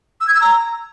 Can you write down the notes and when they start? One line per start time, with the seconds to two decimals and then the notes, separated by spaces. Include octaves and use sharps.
0.21 E6
0.27 G#6
0.34 E6
0.41 A#5